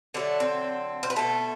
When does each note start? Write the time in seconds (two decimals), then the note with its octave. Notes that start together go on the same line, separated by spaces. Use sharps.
0.14 D3 F#3 A3 D4
0.40 C4
1.03 C5
1.10 B4
1.16 B2 A3 A4